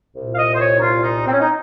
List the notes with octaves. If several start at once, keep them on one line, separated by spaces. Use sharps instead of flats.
C2 A#2
F5
D#5
C5
C#5
D#4
F4
D#4
C4
C#4
D#4